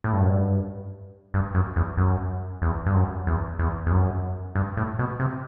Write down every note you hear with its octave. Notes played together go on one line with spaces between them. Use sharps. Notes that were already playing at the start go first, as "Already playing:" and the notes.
A2
G2
F#2
G2
G2
F#2
E2
F#2
E2
G2
F#2
E2
E2
E2
F#2
G2
A2
B2
C3